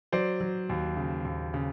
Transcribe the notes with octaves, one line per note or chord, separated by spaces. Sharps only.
F#3 C5 D5
F#3
D#2
C#3
D#2
C#3